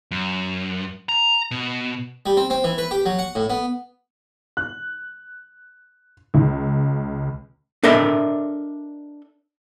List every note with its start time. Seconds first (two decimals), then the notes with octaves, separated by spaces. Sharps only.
0.11 F#2
1.09 A#5
1.51 B2
2.26 G3
2.37 C4
2.50 C4
2.64 E3
2.78 B4
2.91 G4
3.06 F#3
3.19 F#5
3.35 A2
3.50 B3
4.57 F#6
6.34 C#2
7.83 D4 A4 A#4 D#5 E5